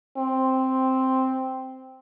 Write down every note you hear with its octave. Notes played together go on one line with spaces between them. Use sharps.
C4